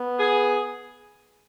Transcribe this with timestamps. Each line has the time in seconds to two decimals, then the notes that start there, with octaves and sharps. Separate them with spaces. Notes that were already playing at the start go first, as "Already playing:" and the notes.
Already playing: B3
0.20 G#4